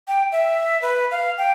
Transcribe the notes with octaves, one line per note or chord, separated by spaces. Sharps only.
G5
E5
B4
F5
G5